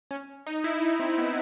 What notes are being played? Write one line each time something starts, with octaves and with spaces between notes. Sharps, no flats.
C#4
D#4
E4
D#4
C4
B3